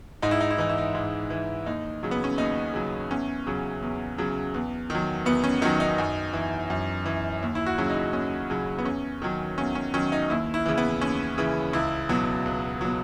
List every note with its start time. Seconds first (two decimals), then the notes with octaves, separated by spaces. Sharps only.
0.22 G#2 D#4
0.31 E4
0.41 D#4
0.51 E4
0.58 E3 D#4
0.69 E4
0.78 D#4
0.95 G#2
1.30 E3
1.66 D#2 D#4
2.03 C#3 F#3
2.11 B3
2.24 C#4
2.38 D#2 D#4
2.74 C#3 F#3
3.10 E2 C#4
3.47 C#3 F#3
3.82 E2
4.18 C#3 F#3
4.54 E2
4.90 D#3 F#3
5.25 E2 B3
5.44 C#4
5.62 D#3 F#3 D#4
5.80 D#4
5.98 F#2
6.33 E3
6.70 F#2
7.06 E3
7.42 D#2
7.55 E4
7.66 F#4
7.78 C#3 F#3 C#4
7.90 D#4
8.13 D#2 C#4
8.50 C#3 F#3
8.79 B3
8.85 E2 C#4
9.22 D#3 F#3
9.58 E2 C#4
9.75 C#4
9.94 D#3 F#3 C#4
10.12 D#4
10.30 D#2 E4
10.54 E4
10.66 C#3 E3
10.78 B3
11.01 D#2 C#4
11.38 C#3 E3
11.73 C#2 E4
12.09 B2 F#3
12.46 C#2
12.81 B2 F#3